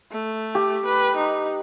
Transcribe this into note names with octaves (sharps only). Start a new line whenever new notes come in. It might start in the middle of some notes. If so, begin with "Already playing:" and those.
A3
G4
B4
D#4